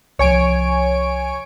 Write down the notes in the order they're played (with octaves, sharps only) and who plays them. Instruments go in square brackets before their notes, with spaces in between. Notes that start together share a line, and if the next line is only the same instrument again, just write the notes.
[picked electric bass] C2 F3 [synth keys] C#5 G#5 D7